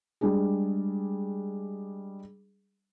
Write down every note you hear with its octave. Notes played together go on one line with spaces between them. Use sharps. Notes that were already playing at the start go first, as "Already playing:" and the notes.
G3 G#3 D4 G#4